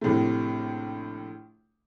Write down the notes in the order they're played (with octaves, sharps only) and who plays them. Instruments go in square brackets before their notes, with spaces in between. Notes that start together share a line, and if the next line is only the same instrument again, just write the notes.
[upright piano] A#1 A2 C3 A3